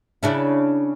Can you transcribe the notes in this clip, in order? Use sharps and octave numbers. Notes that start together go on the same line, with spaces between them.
C#3 D4 E4